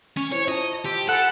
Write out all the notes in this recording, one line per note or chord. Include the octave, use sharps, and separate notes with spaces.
C#4 C#6
E4 C5 C#5
F4 D#5 A5
G4 A5 C6 E6
A4 F#5 G#5 B5 E6